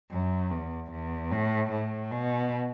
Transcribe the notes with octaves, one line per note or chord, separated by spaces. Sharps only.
F#2
E2
E2
A2
A2
B2